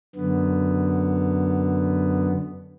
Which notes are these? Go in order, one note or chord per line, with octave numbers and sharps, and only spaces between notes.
F#2 D3 B3